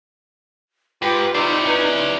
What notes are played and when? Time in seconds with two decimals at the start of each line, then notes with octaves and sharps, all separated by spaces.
1.02 G#2 F4 G4 B4
1.35 D#4 E4 C5 D5 E5
1.66 C#4 B4